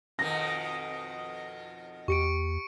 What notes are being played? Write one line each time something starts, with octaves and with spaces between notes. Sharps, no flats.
F2 B2 D#3 A#6
E2 G4 C#6 C#7 D7